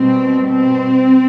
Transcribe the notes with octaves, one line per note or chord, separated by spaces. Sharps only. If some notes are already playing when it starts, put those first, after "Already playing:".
Already playing: B2 G3 C4
C4